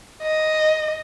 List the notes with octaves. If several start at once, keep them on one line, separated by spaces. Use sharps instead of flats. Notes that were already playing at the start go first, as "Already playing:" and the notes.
D#5